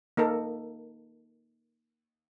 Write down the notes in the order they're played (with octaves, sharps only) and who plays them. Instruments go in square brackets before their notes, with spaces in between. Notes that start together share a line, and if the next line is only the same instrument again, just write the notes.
[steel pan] A#3 D#4 A4 A#4